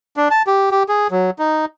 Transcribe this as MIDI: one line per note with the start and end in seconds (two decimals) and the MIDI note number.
0.17 0.28 62
0.31 0.42 81
0.47 0.70 67
0.71 0.83 67
0.89 1.07 68
1.11 1.30 54
1.39 1.65 63